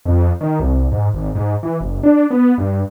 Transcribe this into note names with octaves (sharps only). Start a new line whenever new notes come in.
F2
D#3
C2
G#2
G#1
G#2
E3
F#1
D4
B3
G2